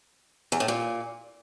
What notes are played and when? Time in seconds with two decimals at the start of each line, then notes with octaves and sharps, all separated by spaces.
0.52 E2
0.60 A2
0.68 A#2